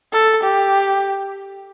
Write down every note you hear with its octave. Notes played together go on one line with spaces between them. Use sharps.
A4
G4